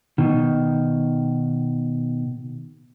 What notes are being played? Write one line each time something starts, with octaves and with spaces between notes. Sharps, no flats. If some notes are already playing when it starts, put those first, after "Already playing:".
B2 D#3